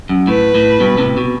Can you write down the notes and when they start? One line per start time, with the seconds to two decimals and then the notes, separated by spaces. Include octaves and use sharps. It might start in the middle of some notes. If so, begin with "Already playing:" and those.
0.09 F#2
0.27 A2 B4
0.55 A2
0.80 G2 B2
0.98 A2 C3
1.17 B2